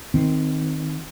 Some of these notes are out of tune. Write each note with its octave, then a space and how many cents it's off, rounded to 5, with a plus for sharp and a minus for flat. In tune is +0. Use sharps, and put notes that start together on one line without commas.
D#3 +0 C4 -5